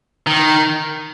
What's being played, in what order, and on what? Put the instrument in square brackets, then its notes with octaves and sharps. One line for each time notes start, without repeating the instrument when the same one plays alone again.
[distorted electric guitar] D#3